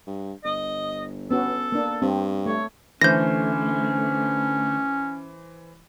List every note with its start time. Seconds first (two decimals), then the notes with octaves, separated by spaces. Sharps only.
0.07 G2
0.44 G1 D#5
1.31 B3 C#4 F#4 A4
1.72 A#3 D4
2.02 G2 C4
2.46 A3 C#5
3.02 D3 E3 A3 C#4 C5 G6 A#6